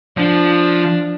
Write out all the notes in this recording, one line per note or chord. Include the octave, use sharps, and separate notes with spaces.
F3 D4